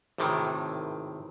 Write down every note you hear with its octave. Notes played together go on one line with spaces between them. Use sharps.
G#1 A2 C3 D#3 E3